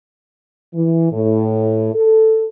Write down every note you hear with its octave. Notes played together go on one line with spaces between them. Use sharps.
E3
A2
A4